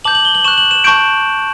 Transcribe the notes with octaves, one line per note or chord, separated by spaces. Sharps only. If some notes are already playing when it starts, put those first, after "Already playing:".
A5 D6 G6 F#7
F#7
G7
F#7
C#6 F#6 E7
F#7
E7
A5 C#6 G6 D7